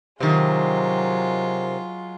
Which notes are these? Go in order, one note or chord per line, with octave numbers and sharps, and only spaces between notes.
C3 D#3 F#3 G#3 F4